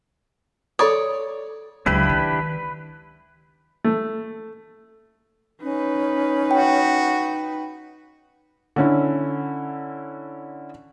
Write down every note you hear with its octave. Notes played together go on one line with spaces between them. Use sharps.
A4 C#5 D5 B5 D#6
C#2 F#3 D4 E4 G4 B4
D#3
A3
C#4 D#4 B4
F#4 G5
D3 C#4 E4